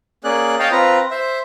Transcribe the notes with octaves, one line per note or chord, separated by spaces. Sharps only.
A#3 C#4 G#4 D5 F#6
C#5 D#5 F5 G5 A5
C4 F4 B4 A#5
C5 E5